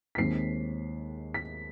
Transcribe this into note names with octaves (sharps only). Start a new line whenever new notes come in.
B6
D#2 D#3 G#3 C4 C7
B6